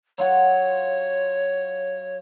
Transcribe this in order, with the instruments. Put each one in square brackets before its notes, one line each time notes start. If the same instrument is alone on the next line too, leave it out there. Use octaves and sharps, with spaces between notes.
[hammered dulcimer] F#3 F4 F#5 [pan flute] C#5